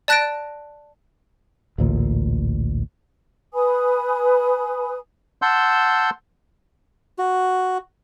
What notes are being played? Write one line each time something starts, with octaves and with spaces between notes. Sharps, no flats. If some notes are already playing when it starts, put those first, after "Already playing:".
D5 A5 F#6 A6 A#6 D7
A1 D2 A#2
B4 G#5 B5 D#6
F#5 A5 C6 E6 G6
F#4